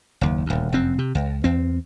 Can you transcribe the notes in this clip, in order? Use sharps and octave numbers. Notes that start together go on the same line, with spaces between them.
F#1 D#2
D#1 D2
F1 F#2 C4
C3
C#2
E2 C4